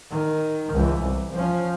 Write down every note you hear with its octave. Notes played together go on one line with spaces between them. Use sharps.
D#3
C#2 E3
C2
F3 C#4